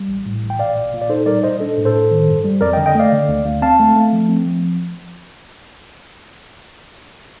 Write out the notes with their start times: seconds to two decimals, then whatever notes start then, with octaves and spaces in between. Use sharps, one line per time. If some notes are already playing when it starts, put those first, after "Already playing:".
Already playing: G3
0.09 A1
0.26 A2
0.43 A1
0.50 G5
0.59 A#2 D5 F5
0.77 A#2
0.93 A#2
1.01 D5
1.09 D#4 A4 C5
1.26 G3 A#4 D5
1.43 A#2 C5 D#5
1.60 D4 A4
1.77 A2
1.85 A4 C5
1.94 A2
2.11 D#3
2.28 G2
2.44 G3
2.61 F2 A#4 D5
2.73 D#5 G5
2.77 D3
2.86 D#5 G5
2.95 A3 D5 F5
3.12 D3
3.28 D2
3.45 D2
3.62 C4 F5 A5
3.79 A3
3.96 A3
4.13 F3
4.29 C4
4.46 F3